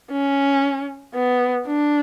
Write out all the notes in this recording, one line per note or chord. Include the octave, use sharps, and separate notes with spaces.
C#4
B3
D4